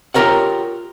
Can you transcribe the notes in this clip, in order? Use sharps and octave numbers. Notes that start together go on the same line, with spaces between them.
F4 G4 G#4 A#4 C#5 F#5